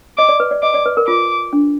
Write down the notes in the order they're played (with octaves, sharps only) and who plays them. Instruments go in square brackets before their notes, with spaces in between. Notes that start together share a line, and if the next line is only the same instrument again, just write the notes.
[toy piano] D#5 [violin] D6
[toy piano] D5
B4
D5
[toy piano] D#5 [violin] D6
[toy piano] D5
B4
A#4
[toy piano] F4 [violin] D6
[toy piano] D4